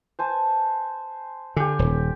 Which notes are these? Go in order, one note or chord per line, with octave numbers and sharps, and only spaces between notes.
C5 G#5 A5
D3 G4 G#5
D#1